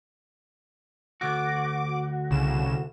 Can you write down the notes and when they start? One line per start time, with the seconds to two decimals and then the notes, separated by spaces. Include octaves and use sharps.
1.21 D2 F#4 D6
2.30 C2 C#3 E7